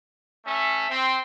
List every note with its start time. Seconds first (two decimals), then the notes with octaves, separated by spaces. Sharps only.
0.44 A3 C#4 E5
0.89 C4